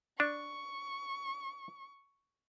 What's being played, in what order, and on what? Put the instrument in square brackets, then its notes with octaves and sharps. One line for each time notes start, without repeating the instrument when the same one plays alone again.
[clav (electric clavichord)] D4 [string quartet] C#6